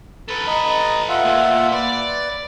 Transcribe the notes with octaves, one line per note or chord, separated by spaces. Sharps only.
A4 B4
D#5 A#5
F4 E5 F#5
A#2
B4 D5